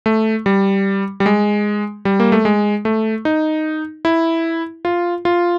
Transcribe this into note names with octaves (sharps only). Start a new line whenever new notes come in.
A3
G3
G3
G#3
G3
A#3
A3
G#3
A3
D#4
E4
F4
F4